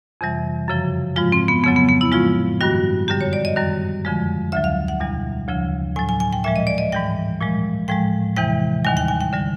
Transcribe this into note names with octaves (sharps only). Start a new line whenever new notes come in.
F2 C3 E3 G3
F#2 C#3 F3
G#2 F3 G#3 F4
C4
B3
F2 C#3 F#3 B3
B3
B3
E4
A2 F3 G#3 F4
G2 D#3 G3 F#4
F#2 D3 G3 G4
C#5
D5
D#5
F#2 D#3 G3
F2 D3 F3 G#3
D2 D3 F#3 E5
F5
F#5
E2 B2 G3
D2 C#3 F3
A2 F#3 G#5
G#5
G#5
G5
A#2 F3 G#3 E5
D#5
D5
D#5
G#2 E3 G3 G5
A#2 F3 G#3
A2 F3 G#3 G5
E2 C3 E3 G#3 G5
D#2 D#3 G3 G#5
G5
G#5
G5
D3 G3